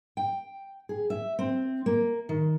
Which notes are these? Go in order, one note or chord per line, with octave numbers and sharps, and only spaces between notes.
G5
G#4
E5
C4
A#3
D#3